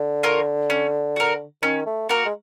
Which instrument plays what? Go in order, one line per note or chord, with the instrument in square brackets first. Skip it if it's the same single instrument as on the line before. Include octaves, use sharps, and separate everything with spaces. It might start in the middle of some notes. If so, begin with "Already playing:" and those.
Already playing: [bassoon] D3
[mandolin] F4 A#4 C#5
C#4
F#4 A#4
[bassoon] D#3 [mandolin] C#4
[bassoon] A3
[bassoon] A#3 [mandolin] F#4 A#4
[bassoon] G#3